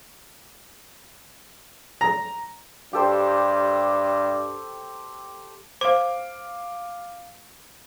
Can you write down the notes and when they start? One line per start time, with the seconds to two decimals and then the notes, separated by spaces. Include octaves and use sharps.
2.01 A#5
2.93 G2 G4 A4 C5
5.81 C5 F5 D6